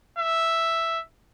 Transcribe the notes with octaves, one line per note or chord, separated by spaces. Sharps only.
E5